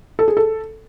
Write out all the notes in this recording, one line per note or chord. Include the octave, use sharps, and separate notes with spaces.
A4
G#4
A4